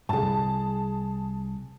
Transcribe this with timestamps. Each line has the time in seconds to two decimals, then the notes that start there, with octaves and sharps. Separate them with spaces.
0.09 C2 G2 G#4 A5